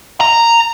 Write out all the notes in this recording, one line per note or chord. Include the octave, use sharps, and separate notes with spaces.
A#5